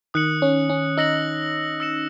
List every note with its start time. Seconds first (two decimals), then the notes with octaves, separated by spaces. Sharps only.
0.14 D#3 D#6 F#6 C#7 F#7
0.42 C#4
0.69 C#4
0.97 D#4 E6 A#6 C#7 F#7
1.80 E6 A#6 C#7 E7